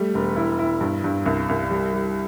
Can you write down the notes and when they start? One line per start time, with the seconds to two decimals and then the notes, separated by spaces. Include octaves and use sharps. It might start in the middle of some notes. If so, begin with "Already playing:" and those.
Already playing: G3 A3
0.14 E1
0.36 E4
0.59 E4
0.81 G2
1.04 G2
1.26 C2
1.49 C2
1.71 G3
1.94 G3